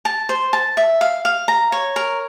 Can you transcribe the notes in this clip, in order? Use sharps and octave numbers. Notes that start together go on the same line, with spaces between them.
A5
C5
A5
E5
F5
F5
A#5
C#5
A#4